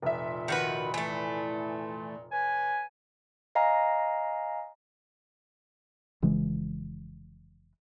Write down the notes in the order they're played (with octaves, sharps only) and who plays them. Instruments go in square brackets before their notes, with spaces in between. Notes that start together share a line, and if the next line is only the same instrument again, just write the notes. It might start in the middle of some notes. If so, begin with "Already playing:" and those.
[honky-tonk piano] F1 E5 [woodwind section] A#2
[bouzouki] D#3 F#4 B4
E3 A3
[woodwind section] B4 C#5 G#5
[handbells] D#5 F5 G#5 A#5
[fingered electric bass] F1 C#3 E3 G#3